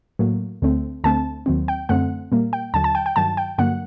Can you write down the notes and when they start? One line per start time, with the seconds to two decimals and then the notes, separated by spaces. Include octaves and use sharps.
0.19 A2 F#3 A#3
0.62 D2 D3 A3 C4
1.04 D2 D3 A3 C4 A5
1.46 D#2 D#3 F#3 C4
1.68 G5
1.89 F#2 D3 A3 C4 F#5
2.32 A#2 G3 A#3
2.53 G5
2.74 D#2 D3 F#3 A5
2.84 A5
2.95 G5
3.06 G5
3.16 G2 D#3 F#3 A5
3.37 G5
3.58 G2 D3 F#3 A#3 F#5